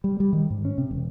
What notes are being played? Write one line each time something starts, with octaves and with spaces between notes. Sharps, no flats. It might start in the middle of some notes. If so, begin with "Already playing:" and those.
G3
G3
D#3
G#2
C#4
C3
E1